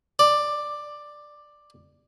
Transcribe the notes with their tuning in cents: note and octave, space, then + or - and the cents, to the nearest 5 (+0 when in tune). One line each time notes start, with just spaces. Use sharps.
D5 +10